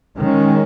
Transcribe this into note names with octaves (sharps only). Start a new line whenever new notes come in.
D#3 G#3 C#4